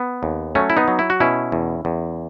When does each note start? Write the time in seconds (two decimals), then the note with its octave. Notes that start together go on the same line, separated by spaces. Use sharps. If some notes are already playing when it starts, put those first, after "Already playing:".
Already playing: B3
0.23 D#2
0.55 F#3 A3 C#4
0.70 E4
0.77 B3 D#4
0.88 F#3
0.99 E4
1.10 F#4
1.20 B2 C#4 E4
1.52 E2
1.85 E2